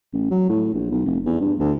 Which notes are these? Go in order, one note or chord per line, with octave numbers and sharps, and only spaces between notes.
A1
F#3
A2
A#1
B1
F1
E2
G2
D2